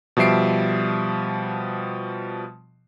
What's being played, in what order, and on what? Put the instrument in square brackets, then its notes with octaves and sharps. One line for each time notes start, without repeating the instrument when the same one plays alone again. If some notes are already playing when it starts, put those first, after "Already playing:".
[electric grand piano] B2 F3 G3 E5 C7 D7